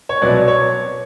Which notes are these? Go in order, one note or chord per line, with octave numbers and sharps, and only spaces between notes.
C#5
C2 B2 F#3 B3 D5
C#5